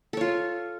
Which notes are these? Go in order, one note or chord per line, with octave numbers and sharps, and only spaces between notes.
F4 A4 C#5